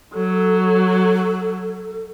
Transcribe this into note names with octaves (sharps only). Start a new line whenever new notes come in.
F#3 A4